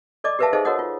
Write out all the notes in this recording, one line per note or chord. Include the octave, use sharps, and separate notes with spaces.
A4 D5 D#5 D6
G4 A#4 B4 E5 F5 A5
D#4 G#4 A4 C5 D#5 F5
F#4 A#4 C#5 D#5 F#5 D#6
F4